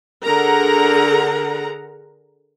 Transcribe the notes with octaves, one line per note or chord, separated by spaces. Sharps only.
D3 G#4 A#4 F#5 A#5